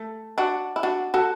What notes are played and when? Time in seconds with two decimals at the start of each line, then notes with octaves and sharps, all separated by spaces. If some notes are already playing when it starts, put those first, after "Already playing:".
Already playing: A3
0.38 D4 F#4
0.76 E4
0.83 D4 F#4
1.14 F#4 A4